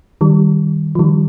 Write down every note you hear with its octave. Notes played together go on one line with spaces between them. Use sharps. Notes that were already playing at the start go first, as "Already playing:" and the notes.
D#3 G3
F3
D#3 G3